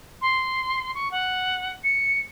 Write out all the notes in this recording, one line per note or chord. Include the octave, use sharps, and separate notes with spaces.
C6
C#6
F#5
C#7